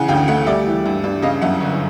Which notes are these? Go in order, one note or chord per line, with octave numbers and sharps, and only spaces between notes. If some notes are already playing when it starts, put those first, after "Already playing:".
Already playing: C#3 E3 F#5 G#5
D2 F5 G5
A3 E5 F#5
G3 D5 E5
E3
G2
G2
C#3 D#5 F5
F#2 E5 F#5
G1